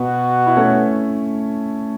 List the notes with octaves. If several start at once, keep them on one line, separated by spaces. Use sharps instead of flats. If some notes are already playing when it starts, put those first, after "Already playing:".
Already playing: B2 B3 F#4
E4
A3 C#4